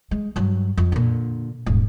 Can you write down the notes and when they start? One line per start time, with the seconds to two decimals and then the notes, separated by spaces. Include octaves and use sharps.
0.11 G#3
0.36 G2 F#3
0.77 F2
0.92 A#2 D3
1.66 D#1 G#2